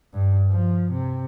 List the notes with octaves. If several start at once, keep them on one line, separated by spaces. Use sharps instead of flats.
G2
F3
C3